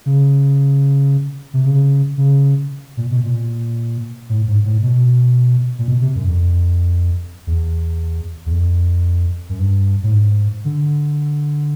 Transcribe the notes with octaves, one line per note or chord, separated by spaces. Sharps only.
C#3
C3
C#3
C#3
A#2
B2
A#2
A2
G#2
A2
B2
A#2
B2
C3
F#2
F2
E2
E2
F2
F#2
G2
A2
G#2
D3